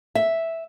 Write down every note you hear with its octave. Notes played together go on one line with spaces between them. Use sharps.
E5